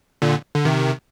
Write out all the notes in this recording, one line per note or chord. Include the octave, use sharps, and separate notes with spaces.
A#2 D3
D3
C3 D#3